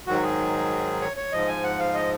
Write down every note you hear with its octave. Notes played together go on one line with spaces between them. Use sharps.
G#2 D#3 F#3 F#4
G#4
C#5
C#5
G#2 F3 D#5
G#5
F#5
F5
D#5